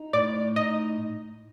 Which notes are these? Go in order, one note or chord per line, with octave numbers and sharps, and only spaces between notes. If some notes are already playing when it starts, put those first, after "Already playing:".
Already playing: D#4
A2 D5
D#4 D#5